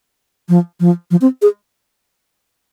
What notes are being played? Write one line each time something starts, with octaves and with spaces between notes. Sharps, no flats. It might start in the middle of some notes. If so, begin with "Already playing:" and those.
F3
F3
F3
C4
G#4